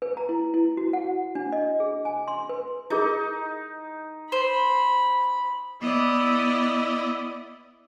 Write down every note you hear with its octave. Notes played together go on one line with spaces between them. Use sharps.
B4
A#5
E4
E4
F#4
F#5
D4
D#5
G#4
G#5
C6
B4
D#4 E4 G#4 A#4
C5 B5
B3 E4 D5 D#5